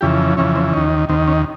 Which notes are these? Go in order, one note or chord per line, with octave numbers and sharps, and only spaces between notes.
F2 C#3 E3 G4
F2 C#3 E3 C#4
C4
D#2 D#3 C#4
D#2 D#3 C4
C#4